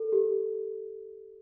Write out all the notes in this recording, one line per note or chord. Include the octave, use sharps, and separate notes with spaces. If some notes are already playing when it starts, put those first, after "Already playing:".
Already playing: A4 A#4
G4